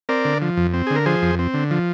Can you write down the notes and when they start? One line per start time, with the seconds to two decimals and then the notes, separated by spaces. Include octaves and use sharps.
0.09 C4 A#4 D5
0.25 D3
0.42 F3
0.57 F2
0.74 C4
0.87 D3 G#4
0.96 A#4
1.06 F3 G#4 C5
1.22 F2
1.39 C4
1.54 D3
1.71 F3